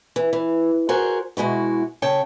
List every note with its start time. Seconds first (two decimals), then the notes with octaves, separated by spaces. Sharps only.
0.16 E3
0.33 E3
0.89 F#4 G#4 A#4 C5 F#5
1.37 B2 G#3 E4 F#4
2.02 C#3 C#5 G5 A5